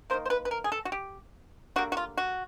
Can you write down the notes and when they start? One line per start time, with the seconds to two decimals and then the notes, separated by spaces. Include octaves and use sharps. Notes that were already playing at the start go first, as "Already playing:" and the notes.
0.10 D#3 F#3 A#3 C5
0.25 C5
0.30 B4
0.45 B4
0.51 A#4
0.64 G#4
0.72 A4
0.85 F#4
0.92 G4
1.76 D3 G3 A#3 F#4
1.92 F#4
1.97 F4
2.18 F#4